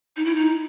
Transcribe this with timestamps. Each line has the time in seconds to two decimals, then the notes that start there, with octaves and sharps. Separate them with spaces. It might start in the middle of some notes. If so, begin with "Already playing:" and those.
0.17 D#4
0.25 E4
0.35 D#4